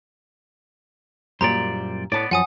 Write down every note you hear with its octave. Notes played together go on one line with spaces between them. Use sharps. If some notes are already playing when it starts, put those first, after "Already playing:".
F#2 A#2 G3 C5 D5 A#5
A2 B3 D5 A5
F#2 F3 F#5 G#5 D#6